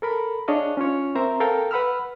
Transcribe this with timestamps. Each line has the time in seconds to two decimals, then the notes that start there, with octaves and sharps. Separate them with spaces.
0.02 A4 A#4 B5
0.48 D4 G#4 C#5 D#5 F5
0.77 C#4 F4 C#5
1.15 C4 A#4 C5 E5 A#5
1.40 A4 A#4 F5 G5
1.71 B4 F#5 B5 E6 F6